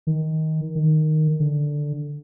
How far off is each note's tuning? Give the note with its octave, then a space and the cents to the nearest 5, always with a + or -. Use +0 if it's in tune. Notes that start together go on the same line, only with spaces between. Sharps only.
D#3 +15
D#3 -5
D3 +0